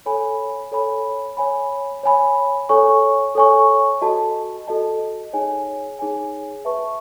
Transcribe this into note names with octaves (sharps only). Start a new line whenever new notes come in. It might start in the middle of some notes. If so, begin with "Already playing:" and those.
A4 C#5 G#5 B5
A4 C#5 G#5 B5
C#5 G#5 B5
C#5 G#5 B5
A4 C#5 G#5 C#6
A4 C#5 G#5 C#6
F#4 A4 D#5 A5
F#4 A4 D#5 A5
D#4 G#4 C#5 G#5
D#4 G#4 C#5 G#5
B4 E5 A5 C#6